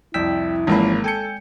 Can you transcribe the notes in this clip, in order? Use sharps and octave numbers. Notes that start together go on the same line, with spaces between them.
C2 F2 E4 G5 E6 B6
G#1 E3 F3 G#3 A#3 C#4 B5
A4 G5 G#5 G6 C#7